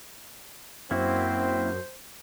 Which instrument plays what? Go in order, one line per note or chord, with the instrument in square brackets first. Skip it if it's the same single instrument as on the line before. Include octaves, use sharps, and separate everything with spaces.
[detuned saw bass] F#2 [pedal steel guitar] A#3 E4 F#4 [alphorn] C4 [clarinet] C5